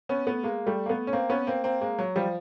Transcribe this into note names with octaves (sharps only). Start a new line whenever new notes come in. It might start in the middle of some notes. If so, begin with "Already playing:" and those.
B3 C#4
A3 B3
G#3 A#3
G3 A3
A#3
A3 B3
C#4
A#3 C4
B3 C#4
A#3 C4
A#3 C4
G#3 A#3
F#3
F3 G3